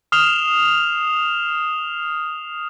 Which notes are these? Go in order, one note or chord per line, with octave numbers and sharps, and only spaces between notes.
D#6 F6 C7 E7 F7 G7